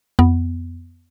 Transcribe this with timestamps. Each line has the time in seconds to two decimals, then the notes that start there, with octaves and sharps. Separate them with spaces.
0.19 F2 B3